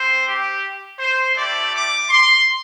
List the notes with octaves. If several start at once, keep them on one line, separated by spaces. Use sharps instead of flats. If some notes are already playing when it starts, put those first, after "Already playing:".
Already playing: C4 C5
G4
C5
A3 E4 G4 D5
D6
C6